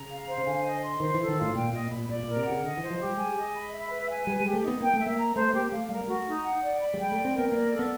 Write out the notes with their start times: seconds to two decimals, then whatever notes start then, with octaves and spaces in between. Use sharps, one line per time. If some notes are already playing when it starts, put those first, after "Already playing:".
Already playing: C#3 A#5
0.10 F5
0.28 C5
0.38 C#3
0.47 D3 G#5
0.65 D#5
0.82 C6
1.00 D#3 C5
1.14 E3 A4
1.28 D#3
1.37 A2 F4
1.55 A#2 G5
1.72 A#2 D#5
1.91 A#2 B5
2.09 A#2 D5
2.23 A#2 A#4
2.36 C3
2.45 C#3 F#5
2.64 D3 D#5
2.77 E3 C5
2.90 F3
3.00 G3 G4
3.17 G#3 G#5
3.36 D#5
3.54 B5
3.72 E5
3.90 B4
4.09 G#5
4.27 G3 B4
4.40 G#3 G4
4.53 A3
4.63 B3 D#4
4.81 A#3 G5
4.93 A3
4.99 E5
5.06 A#3
5.17 A#5
5.35 A3 C5
5.53 A#3 G4
5.71 A3 F5
5.89 G3 A#4
6.01 A#3
6.08 A3 F#4
6.26 D#4
6.44 F#5
6.62 D5
6.80 B5
6.94 G3
6.97 G#3 G5
7.12 A3 D5
7.25 C4
7.34 B3 A#4
7.52 A#3 D5
7.70 A4
7.79 B3